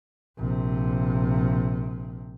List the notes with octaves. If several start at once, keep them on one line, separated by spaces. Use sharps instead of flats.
A#1 C3